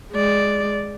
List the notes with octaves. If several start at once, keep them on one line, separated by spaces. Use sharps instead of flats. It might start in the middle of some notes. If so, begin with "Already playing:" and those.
G#3 D5